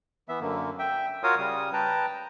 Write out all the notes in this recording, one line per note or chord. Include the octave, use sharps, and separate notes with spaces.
E3 B3 E5
F#2 D3 A#3
E5 G5
F4 F#4 A#4 C#5 F5 D#6
C#3 G3 D#6
B4 G5 A5 A#5